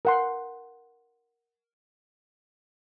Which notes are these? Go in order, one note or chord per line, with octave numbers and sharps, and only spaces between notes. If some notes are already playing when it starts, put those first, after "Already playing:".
A#4 F#5 C6